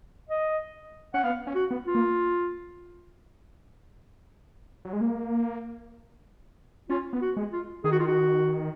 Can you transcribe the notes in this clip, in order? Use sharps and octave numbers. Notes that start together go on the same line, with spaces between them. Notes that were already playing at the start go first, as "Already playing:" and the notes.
D#5
C#4 F#5
B3 F5
C#4
F#4
B3
F4
A#3
F#3
G#3
A#3
C#4 F4
B3
F#4
G#3
F4
D#3 G#4
F#4
F4
F#4